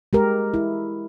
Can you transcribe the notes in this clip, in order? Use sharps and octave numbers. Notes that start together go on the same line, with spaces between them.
G#3 G4 A#4
E4